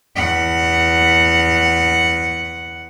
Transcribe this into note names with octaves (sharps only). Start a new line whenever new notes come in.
E2 F#5